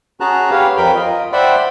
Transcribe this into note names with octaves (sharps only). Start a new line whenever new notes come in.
C#4 F#4 G#4 A5 A#5 F#6
G4 B4 C#5 F5
F2 A#4 G5 B5
F4 D#5
C5 D5 E5 F#5 G5 B5